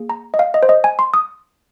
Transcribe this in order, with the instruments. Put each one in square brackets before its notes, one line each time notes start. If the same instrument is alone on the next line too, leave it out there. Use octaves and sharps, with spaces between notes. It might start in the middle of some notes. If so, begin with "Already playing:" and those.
Already playing: [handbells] A#3 G#4
A#5
D#5
F5
D#5
C5
D#5
G#5
C6
D#6